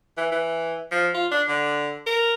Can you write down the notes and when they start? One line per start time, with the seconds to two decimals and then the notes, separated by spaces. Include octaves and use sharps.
0.17 E3
0.32 E3
0.91 F3
1.14 F4
1.32 D4
1.48 D3
2.06 A#4